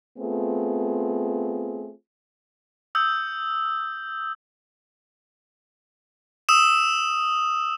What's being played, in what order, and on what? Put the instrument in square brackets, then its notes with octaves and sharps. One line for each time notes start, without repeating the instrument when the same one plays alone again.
[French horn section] A3 B3 C4 F4 G#4
[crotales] D#6 E6 G6
D#6 E6 E7